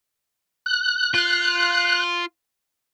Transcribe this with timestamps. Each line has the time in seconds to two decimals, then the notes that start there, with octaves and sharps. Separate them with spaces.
0.66 F#6
1.14 F4